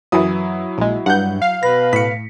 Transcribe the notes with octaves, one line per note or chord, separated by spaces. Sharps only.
F#2 E3 F#3 E4 D#6
A#1 G#3
G2 F#5 G6
F5
B2 B4 A#6
A2 B6 C#7